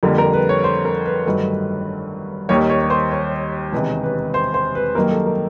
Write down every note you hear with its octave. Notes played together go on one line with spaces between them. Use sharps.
F2 D3 G3 A#3 A#4
A#4
B4
C#5
C5
A#4
B4
G1 G2 D#3 F#3 A3
D#2 D#3 G3 A#3 C#5
C#5
C#5
C5
C#5
E1 E2 C3 D#3 B4
B4
C5
C5
B4
F#2 D#3 G3 A#3 A#4
A4
A#4